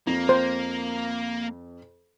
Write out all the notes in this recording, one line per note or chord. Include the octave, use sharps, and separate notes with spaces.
F2 A#3
C5